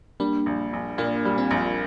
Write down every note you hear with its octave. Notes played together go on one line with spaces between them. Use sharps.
G3 A#3 D4
A#1
A#1
A#2 A#3 D4
G3
C4 F4
A#1